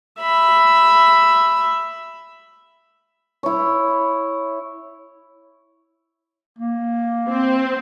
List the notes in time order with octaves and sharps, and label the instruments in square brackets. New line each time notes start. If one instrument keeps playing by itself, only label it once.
[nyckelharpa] E5 B5
[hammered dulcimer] E4 C#5
[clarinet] A#3
[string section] C4